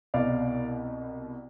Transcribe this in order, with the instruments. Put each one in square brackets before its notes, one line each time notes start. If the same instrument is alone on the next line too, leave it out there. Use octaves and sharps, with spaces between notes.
[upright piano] C2 B2 D5 F5